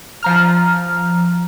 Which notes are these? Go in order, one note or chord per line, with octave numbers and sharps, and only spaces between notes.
F3 A#5 F6